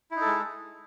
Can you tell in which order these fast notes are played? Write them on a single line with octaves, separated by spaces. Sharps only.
E4 D#4 A4 G#3